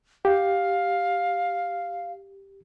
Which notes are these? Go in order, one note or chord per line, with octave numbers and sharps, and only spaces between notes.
G4 F5